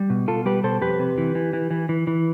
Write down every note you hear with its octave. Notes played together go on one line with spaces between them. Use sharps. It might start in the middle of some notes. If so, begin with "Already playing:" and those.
Already playing: G3
B2
B2 F4 A4
G3 G4 B4
B2 A4 C5
F2 G4 B4
C3
E3
E3
E3
E3
E3
E3